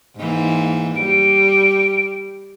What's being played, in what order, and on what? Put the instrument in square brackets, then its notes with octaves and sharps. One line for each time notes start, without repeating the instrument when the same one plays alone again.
[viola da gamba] G#2 E3 A#3
[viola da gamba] G3 [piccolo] D7